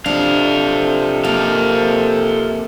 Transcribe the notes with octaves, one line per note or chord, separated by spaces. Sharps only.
C3 F3 D4 A4 F5
A#3 A4 F5